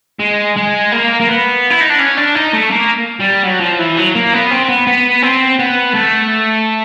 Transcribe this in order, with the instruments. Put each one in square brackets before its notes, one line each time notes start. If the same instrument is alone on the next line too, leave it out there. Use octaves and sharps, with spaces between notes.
[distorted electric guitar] G#3
G#3
A#3
A#3
B3
E4
D#4
D4
C#4
D4
D#4
A3
A#3
G3
F#3
F3
E3
F#3
A#3
B3
C4
B3
B3
C4
B3
A3